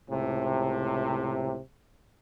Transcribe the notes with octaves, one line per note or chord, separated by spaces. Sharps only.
C#2 A2 C3